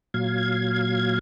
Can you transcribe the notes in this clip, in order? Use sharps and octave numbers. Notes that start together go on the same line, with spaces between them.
A#2 F#3 F5 G#6